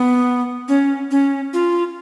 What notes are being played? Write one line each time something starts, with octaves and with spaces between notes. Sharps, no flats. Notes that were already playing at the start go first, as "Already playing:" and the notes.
Already playing: B3
C#4
C#4
F4